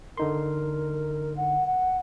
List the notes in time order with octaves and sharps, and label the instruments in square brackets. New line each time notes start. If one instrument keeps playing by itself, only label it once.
[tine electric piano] D3 D#4 C6 [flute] A#4
[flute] F#5
F#5